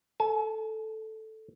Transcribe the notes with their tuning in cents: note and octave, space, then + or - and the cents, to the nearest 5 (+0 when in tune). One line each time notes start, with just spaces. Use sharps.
A4 +0 G#5 +45